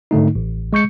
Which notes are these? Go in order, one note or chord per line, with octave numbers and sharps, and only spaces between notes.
G#2 D3 A3 D#4
A1
G#3 C#6 G6 C#7